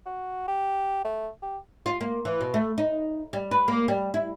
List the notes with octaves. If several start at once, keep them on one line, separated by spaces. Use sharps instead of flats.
F#4
G4
A3
G4
F4
A#3
E3
B2
A3
D#4
G3
B4
A#3
G3
E4